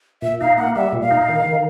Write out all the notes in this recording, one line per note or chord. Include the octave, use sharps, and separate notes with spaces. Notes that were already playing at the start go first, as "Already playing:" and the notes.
A#2 E5
D#4 F5
A#3 F#5
G3 E5
A#2
F5
D#4
D#3
D#3